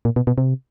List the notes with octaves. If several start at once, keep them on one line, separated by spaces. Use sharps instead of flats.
A#2
B2
B2
C3